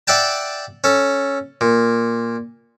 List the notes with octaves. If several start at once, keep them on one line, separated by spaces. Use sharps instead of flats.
D5 E5 F#5 G5 A5
C#4 A4
A#2